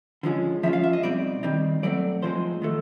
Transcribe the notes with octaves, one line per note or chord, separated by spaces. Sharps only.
D3 F3 G#3 C#4
F3 G#3 C#4 F4 E5
F5
E5
D#5
B2 G3 C4 D#4 D5
D#3 G3 C4 D#4
B2 F#3 A3 C4 D5
A2 F3 G#3 C4 D#4 C5
D#3 F#3 A3